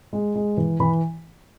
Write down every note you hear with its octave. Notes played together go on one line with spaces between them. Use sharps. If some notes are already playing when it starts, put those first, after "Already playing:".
G#3
G#3
E3
E3 B5